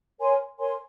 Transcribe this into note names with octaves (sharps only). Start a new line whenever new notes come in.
A#4 C#5 G#5 C6
A#4 C#5 G#5 C6